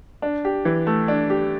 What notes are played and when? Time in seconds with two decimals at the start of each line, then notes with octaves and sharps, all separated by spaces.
0.22 D4
0.45 G4
0.65 E3
0.87 A3
1.08 D4
1.30 G4